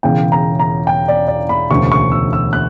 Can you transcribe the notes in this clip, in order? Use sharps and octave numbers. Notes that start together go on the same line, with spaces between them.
E1 E2 C#3 G5
A#5
A#5
G5
D5
D5
B5
E1 D2 C#3 C#6
C#6
E6
E6
F#6